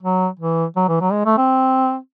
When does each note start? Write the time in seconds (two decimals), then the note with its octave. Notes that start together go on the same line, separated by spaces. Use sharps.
0.03 F#3
0.39 E3
0.76 F#3
0.88 E3
1.01 F#3
1.12 G#3
1.25 A3
1.37 C4